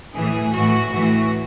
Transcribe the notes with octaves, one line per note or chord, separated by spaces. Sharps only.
A2 E3 G#4
A2 E3 F#4
A2 E3 F#4